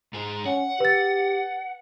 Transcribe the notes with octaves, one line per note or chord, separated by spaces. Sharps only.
G#2 G#4
C#4 F#5
G4 B4 A6